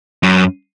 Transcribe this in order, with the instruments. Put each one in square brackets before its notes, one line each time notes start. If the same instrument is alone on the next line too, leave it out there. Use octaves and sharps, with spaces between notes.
[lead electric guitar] F#2